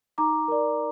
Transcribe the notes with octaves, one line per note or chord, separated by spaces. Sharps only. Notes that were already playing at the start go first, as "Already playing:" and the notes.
D#4 A#5 D6
A#4 D5